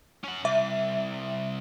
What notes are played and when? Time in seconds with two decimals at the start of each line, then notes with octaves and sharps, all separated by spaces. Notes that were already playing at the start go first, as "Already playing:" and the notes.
0.24 C#4 F#5
0.45 C2 E5